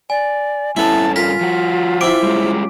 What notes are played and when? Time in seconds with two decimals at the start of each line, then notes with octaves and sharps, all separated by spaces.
0.10 D5 G#5
0.77 G2 B3 C#4 E4 A4 A5
1.16 F4 A#4 B6
1.41 F3 F#4
2.01 C4 E4 D6 D7
2.23 G3 G#3 C#4